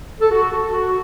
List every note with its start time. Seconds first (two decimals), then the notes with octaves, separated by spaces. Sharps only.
0.20 A4
0.31 F#4
0.52 A4
0.73 F#4